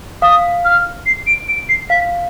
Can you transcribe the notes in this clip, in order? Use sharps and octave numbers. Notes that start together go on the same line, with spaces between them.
F5 D#6
F6
C7
D7
D7
C7
F5 B6